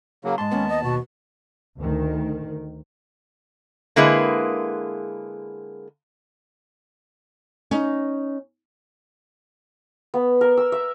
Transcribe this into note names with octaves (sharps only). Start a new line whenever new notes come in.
C#3 F#3 A#3
G#2 G#3 A5 C6
D#2 A#3 B3 C#4
D#5
B2 F#4
D2 D#3
D3 G#3 A#3 E4 G#4 B4
C#4 D#4
B3
A#4
E6
E5